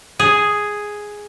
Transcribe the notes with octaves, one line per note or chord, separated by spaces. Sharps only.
G#4